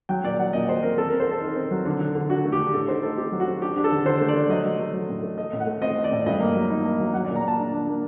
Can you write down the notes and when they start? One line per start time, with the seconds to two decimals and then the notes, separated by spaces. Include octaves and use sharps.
0.09 F#3 G5
0.24 A#2 D5
0.39 F#3 F#5
0.53 A#2 D#5
0.69 F#3 C5
0.83 C4 A#4
0.98 C4 A4
1.08 A#4
1.12 C4
1.20 C5
1.27 C4 A4
1.42 D#4
1.56 C4
1.71 F#3
1.85 D3
2.01 D3
2.15 D3
2.29 D4 F#4
2.44 A3
2.52 G4
2.59 D4
2.73 A2 A4
2.88 D#4 C5
3.03 D#4 A4
3.17 C4 G4
3.32 F#3
3.40 F#4
3.47 C4
3.62 D4 G4
3.77 D4
3.84 A4
3.92 D3
4.05 D3 C5
4.21 A3
4.28 D5
4.35 A3
4.49 F#3 D#5
4.65 F#3
4.79 A3
4.93 F#3
5.09 A2
5.23 A3
5.38 A3 D#5
5.53 A2
5.60 F#5
5.67 A3
5.82 C4 D#5
5.97 A3
6.04 D5
6.12 A2
6.26 G2 D#5
6.40 A#3
6.56 F#3
6.70 D#4
6.85 A#3
7.00 F#3
7.13 F#3 F#5
7.25 D5
7.29 A#2
7.36 A#5
7.43 A#3 A5
7.59 D4
7.73 D4
7.88 A#3